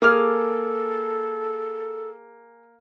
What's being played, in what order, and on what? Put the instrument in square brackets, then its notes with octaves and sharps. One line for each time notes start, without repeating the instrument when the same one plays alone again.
[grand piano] A#3 [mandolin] G#4 D6 F6 [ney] A4